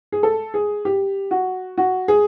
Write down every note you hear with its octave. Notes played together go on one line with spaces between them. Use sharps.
G#4
A4
G#4
G4
F#4
F#4
G#4